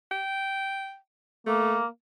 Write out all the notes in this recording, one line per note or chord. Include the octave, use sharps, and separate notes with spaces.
G5
A3 A#3